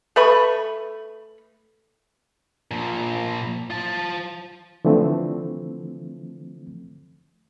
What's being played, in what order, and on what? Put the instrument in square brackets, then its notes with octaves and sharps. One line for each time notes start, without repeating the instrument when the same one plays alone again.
[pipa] A3 B4 B5 C#6
[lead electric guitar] A#2 F3
F4 A5
[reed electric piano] D3 E3 F3 A3 C4